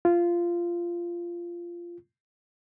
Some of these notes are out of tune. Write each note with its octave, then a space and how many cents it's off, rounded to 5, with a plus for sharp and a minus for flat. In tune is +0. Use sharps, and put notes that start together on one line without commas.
F4 -15